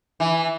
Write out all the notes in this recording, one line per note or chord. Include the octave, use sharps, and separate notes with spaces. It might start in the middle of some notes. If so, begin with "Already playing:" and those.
E3